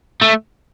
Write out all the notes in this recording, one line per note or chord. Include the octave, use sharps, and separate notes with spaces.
A3